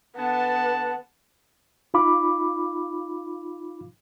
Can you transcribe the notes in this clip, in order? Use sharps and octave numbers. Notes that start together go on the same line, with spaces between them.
D3 B3 F#5 A5
D#4 F4 F5 B5 D6